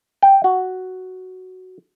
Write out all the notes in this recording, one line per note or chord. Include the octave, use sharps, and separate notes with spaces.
G5
F#4